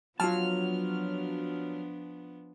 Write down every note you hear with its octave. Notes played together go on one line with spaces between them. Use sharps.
F3 F#3 B3 D4 F4 A5 F6